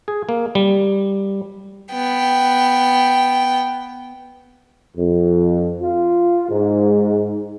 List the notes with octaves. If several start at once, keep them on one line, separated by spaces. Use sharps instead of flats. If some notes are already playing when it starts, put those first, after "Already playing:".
G#4
A#3
G3
B3 G5
F2
F4
G#2